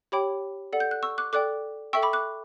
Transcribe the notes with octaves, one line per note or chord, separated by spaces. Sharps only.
G4 C#5 G5 B5 D6
A4 D5 F#5
G6
F#6
C#6 E6
D6 F#6
A4 D5 G5 D6 F#6
A4 E5 G5 C#6 E6
B5 D6
D6 F#6